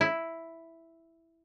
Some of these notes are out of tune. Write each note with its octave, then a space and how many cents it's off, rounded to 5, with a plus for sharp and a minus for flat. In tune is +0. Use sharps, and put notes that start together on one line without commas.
E4 +0